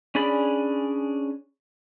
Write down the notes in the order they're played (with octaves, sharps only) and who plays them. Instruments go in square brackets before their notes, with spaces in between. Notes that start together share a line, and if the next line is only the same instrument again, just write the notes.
[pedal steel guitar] C#4 D4 G#4 D5 B5